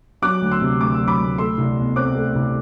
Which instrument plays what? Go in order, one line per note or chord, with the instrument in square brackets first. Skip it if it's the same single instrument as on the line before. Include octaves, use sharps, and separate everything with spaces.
[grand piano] F#3 D6 F#6
D2
C6 E6
C3
D2 D6
E6
F#3
B5 D6
D2
A3 C6 E6
C2
B2
C4 D6 F#6
A3
C2